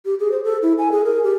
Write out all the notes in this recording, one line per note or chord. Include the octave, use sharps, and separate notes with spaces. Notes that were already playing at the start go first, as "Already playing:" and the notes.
G4
G#4
C5
A4
E4
G#5
G#4
A#4
G4